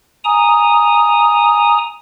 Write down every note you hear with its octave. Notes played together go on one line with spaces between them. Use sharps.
G#5 A#5 D#6